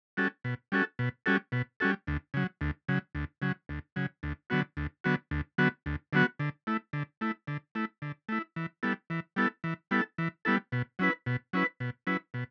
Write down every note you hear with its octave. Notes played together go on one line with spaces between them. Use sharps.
G3 C#4 F#4 A4
B2
G3 C#4 F#4 A4
B2
G3 C#4 F#4 A4
B2
G3 C#4 F#4 A4
D2
C#3 F#3
D2
C#3 F#3
D2
C#3 F#3
D2
C#3 F#3
D2
D3 F#3 B3 F#4
D2
D3 F#3 B3 F#4
D2
D3 F#3 B3 F#4
D2
D3 F#3 B3 F#4
D3
A3 E4
D3
A3 E4
D3
A3 E4
D3
A3 E4
E3
G3 B3 E4 A4
E3
G3 B3 E4 A4
E3
G3 B3 E4 A4
E3
G3 B3 E4 A4
B2
F#3 C#4 E4 B4
B2
F#3 C#4 E4 B4
B2
F#3 C#4 E4 B4
B2